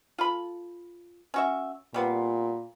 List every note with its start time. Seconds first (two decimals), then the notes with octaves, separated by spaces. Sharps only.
0.18 F4 A4 B5
1.34 C#4 F#4 E5
1.94 A#2 G3 B3 C4